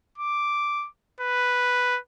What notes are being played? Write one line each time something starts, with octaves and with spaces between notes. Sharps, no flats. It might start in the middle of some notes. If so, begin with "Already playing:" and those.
D6
B4